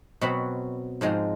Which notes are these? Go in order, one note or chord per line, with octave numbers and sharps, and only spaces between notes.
B2 F#3 C4 F#5 B5
G#2 F3 G#3 C4 A#5